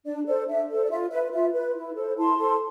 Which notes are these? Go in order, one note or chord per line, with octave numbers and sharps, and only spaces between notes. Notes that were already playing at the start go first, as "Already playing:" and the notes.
D4 D5
A4 C5 D5
D4 E5
A4 C5
D5
F4 E5
B4 E5
F4 E5
B4
E4
A4 C5
E4 A5 C6
A4 C5